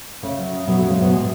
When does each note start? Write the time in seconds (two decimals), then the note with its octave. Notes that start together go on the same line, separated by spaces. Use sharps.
0.23 C#3 A3
0.38 F#3
0.52 C#3
0.67 B2 F#3 B3
0.79 A3
0.82 C#3
0.90 G#3
0.98 B2 F#3 B3
1.12 A2 G#3 G#4